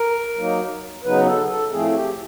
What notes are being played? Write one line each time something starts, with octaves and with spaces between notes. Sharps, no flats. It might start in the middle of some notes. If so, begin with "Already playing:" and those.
Already playing: A#4
F#3 A#3 D#4
C#3 F#3 B3 D#4 B4
A4
A4
A2 F3 A3 C4 G#4
G4